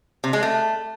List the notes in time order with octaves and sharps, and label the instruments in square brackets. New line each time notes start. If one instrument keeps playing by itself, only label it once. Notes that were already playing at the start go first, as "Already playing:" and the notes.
[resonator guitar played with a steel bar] C3
G#3
A3